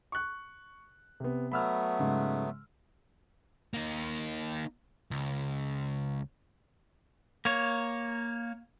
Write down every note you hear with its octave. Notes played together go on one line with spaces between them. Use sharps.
C#6 F#6
C3 B3
F#3 A3 B3 B5 E6 F6
G#2 C#3 G#3
A#3 D#4
C#2
A#3 C#5